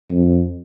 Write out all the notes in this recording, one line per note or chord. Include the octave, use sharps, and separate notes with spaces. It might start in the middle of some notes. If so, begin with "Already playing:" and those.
F2